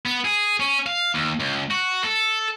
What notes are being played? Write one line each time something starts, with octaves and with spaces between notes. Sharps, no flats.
B3
G#4
C#4
F5
D#2
C#2
F#4
A4